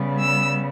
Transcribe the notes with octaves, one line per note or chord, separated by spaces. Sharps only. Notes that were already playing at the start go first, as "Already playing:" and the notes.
Already playing: C#3 G3 B3
E6